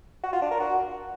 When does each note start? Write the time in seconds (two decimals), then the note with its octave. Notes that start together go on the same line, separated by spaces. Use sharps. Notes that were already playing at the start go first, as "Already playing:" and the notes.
0.24 F#4
0.33 F4
0.42 D4
0.51 A#4
0.60 F#4